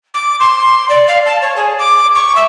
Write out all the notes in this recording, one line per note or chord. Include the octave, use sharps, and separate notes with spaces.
D6
C6
D5
F5
A5
C#5
G#4
D6
C#6
E5